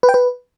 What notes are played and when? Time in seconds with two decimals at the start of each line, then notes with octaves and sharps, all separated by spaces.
0.03 B4
0.09 G5
0.14 B4